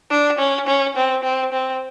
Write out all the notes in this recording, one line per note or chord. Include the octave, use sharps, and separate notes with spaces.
D4
C#4
C#4
C4
C4
C4